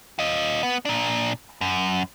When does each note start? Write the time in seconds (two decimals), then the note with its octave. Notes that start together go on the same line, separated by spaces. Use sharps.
0.19 F4 D#5
0.63 B3
0.85 A#2 D4
1.61 F#2